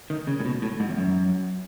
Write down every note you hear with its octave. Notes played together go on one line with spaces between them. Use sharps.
D#3
C#3
A2
B2
A2
G#2
E2
F#2